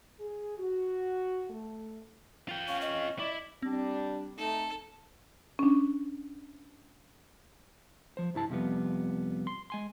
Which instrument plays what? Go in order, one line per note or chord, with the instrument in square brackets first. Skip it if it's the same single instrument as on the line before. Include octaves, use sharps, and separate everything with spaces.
[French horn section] G#4
F#4
A3
[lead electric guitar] F4 G5
[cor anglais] C#4 [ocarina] F5
[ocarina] D#5
[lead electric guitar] E4 [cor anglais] D5
[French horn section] G3 D4 [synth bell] C4
[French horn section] A3 D#4 [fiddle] A4
[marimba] C#4 D4
[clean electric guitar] F3 C5
C2 G2 E4 A5
F2 C3 F3 G3 B3
C6
G#3 G#5 C6